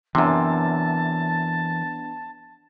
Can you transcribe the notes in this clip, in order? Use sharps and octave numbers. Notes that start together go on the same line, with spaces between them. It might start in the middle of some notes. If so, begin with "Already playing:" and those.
F#2 C3 E3 B3 D4 A5